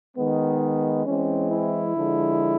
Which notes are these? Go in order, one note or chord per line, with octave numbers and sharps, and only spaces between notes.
D#3 G#3 B3
E3 G#3 C4 C#4
E4
D3 F3 G#3